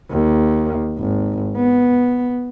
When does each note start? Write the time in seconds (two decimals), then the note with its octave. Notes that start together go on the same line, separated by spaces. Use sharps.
0.11 D#2
0.99 G#1
1.56 B3